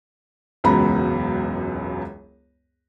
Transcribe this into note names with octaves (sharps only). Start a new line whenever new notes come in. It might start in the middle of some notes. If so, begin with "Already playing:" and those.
E1 C#2 F#2 B3 A#5 B5